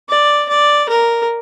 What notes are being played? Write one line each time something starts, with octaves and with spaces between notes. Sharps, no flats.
D5
D5
A#4